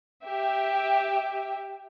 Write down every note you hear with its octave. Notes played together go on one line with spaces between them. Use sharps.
G4 E5 G5